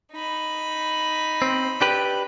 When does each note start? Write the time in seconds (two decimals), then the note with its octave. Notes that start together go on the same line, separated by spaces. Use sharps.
0.12 D#4 B5
1.42 C4
1.81 D4 G4 B4